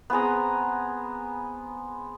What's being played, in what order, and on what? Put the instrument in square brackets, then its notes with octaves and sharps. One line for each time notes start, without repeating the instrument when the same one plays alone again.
[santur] B3 C4 G#4 A#5